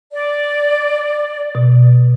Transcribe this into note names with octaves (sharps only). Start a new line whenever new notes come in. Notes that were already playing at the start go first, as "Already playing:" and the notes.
D5
B2